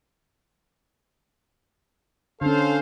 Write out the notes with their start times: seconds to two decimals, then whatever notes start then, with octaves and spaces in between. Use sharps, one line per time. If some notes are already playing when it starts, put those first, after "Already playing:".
2.41 D3 C#4 A4 C5 F5